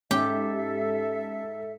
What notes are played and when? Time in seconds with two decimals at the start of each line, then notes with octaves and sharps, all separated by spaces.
0.11 G#2 C#4 G4 A4 E5